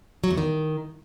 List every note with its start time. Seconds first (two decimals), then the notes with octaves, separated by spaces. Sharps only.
0.24 F#3
0.31 E2
0.38 D#3